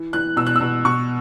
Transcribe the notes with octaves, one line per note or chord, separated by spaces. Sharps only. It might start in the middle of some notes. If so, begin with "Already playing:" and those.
Already playing: E3
E3 F#6
B2 E6
F#6
E6
B2
B2 C#6